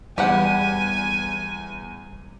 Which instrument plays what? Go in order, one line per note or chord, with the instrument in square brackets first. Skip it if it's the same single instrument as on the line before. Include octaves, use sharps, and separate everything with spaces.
[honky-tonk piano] E2 [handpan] G3 [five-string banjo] G4 B4 F#5 [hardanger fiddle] G#5